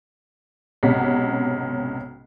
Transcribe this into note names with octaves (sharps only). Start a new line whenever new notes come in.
B1 G#2 C3 C#4 F#5 B6